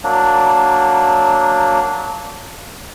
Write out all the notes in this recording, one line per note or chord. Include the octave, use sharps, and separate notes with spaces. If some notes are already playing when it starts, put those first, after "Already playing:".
F#3 A#3 D4